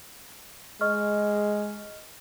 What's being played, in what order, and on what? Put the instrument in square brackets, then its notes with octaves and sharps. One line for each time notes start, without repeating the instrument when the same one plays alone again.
[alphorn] G#3 [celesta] D#5 C#6 F6